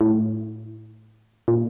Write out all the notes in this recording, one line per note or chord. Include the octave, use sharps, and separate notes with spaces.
A2
A#2